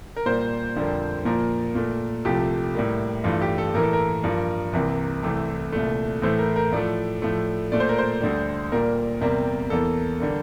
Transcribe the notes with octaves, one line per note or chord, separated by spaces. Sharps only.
A#4
A#2 G3 A#3 C5
F2 D3 G3 A#3
A#2 F3 A#3 A#4
A#2 A3
C2 C3 F3 A3 G4
A2 G3 A#3
G2 E3 A3 F4
G4
A4
A2 E3 A#3 A#4
A4
A#4
G2 F3 A#3
C2 C3 E3 A#3
C2 C3 E3 A3
C2 A#2 A3
A2 E3 A3 C5
A#4
A#4
A2 F3 A3 D5
A2 F3 A3
A#2 A3 D5
C5
A#4
C5
D2 D3 G3
A#2 G3 A#3 A#4
E2 C3 G3 A#3
E2 E3 A#3 A4
D3 G3 A#3